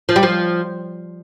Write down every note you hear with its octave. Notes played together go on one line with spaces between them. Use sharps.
F3
G3
F3